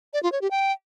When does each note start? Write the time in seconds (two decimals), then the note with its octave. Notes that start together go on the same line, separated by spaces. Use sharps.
0.14 D5
0.23 F4
0.32 C#5
0.41 G4
0.51 G5